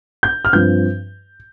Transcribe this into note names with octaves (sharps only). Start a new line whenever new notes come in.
G6
F6
G2 F3 C4 G6